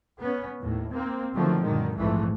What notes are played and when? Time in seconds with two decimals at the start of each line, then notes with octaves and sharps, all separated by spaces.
0.21 B3 C#4
0.59 D#2 A2
0.92 A#3 C4
1.35 D3 D#3 F3 F#3 A3 C4
1.63 F#2 A#2 D3 D#3 G#3
1.96 A#1 F2 G#2 E3 G#3 A3